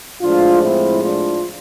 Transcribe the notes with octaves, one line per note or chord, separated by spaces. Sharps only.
A2 F3 G#3 D4 F4
C4 E4
D4 F4